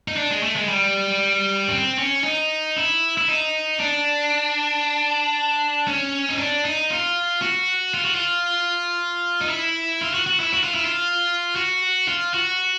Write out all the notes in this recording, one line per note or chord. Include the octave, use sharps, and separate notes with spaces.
D#4
D4
G#3
A3
G#3
G3
C#4
C4
C#4
D#4
E4
E4
D#4
D4
C#4
D#4
D4
D#4
F4
F#4
F4
F#4
F4
D#4
E4
F4
F#4
F#4
E4
F#4
F4
E4
F4
F#4
F4
F#4